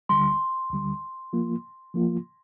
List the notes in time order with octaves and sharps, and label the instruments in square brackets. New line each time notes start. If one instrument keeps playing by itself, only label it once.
[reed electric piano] D2 D3 G3 [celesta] C6
[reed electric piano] D2 D3 G3
F3 A#3 F4
F3 A#3 F4